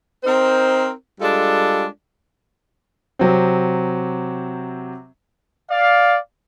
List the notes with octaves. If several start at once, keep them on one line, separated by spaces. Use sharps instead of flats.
C4 D#4 A#4 C5
G3 G#3 D4 F4 A4
C3 F#3 C4
D5 F5